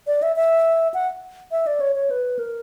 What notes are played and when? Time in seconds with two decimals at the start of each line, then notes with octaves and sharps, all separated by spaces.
0.07 D5
0.22 E5
0.36 E5
0.94 F#5
1.51 E5
1.67 D5
1.80 C#5
1.96 C#5
2.10 B4
2.39 A#4